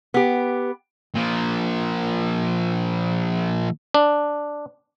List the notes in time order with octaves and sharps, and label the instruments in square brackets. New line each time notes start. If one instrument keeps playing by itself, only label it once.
[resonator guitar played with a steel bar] B3 G4
[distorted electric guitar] A#2 F3
[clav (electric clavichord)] D4